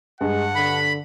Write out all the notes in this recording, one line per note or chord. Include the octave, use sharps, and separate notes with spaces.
G2 G#3 F#5
D3 B5